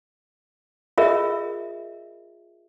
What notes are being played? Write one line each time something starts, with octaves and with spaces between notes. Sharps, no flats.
F4 G#4 A#4 D#5 E5